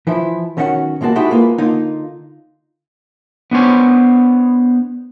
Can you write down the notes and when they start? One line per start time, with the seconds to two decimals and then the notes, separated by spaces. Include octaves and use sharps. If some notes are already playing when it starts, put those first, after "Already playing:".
0.07 E3 F3 E4
0.57 B1 D#3 C#4 E4 F#4 F#5
1.01 B2 G#3 A#3 F#4 A5
1.15 G#3 D#4 E4 F#4 G4 A4
1.30 G#3 A#3 F4 B4
1.58 D3 A#3 D#4 F4
3.51 B3 D4 C5 C#5